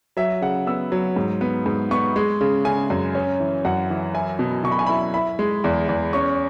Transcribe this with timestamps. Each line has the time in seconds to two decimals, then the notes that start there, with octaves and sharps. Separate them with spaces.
0.17 F#3 E5
0.41 C#3 F#5
0.67 B3 E6
0.92 F#3
1.16 G#2
1.41 B3
1.66 G#2
1.91 B3 C#6
2.16 G#3
2.41 C#3
2.65 C#3 G#5
2.90 F#2
3.15 C#4
3.40 E3
3.65 F#2 F#5
3.90 E3
4.15 E4 G#5
4.39 B2
4.64 B2 C#6
4.71 B5
4.79 G#5
4.86 E4 B5
5.14 E4 B5
5.39 G#3
5.64 E2
5.89 E2
6.13 C#4 C#6